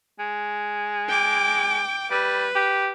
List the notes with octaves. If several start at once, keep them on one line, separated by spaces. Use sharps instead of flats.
G#3
G5 D6
G3 B4
G4